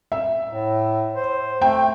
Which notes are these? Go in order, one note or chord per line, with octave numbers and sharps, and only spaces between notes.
E5
A2
C5
A3 G5